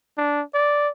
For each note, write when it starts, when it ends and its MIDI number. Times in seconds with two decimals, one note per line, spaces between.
0.17 0.42 62
0.54 0.89 74